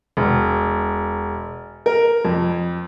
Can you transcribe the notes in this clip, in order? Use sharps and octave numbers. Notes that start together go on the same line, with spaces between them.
E1
A#4
F2